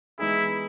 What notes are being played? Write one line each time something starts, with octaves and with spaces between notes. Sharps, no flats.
E3 G#3 B3 D#4 E4 G#4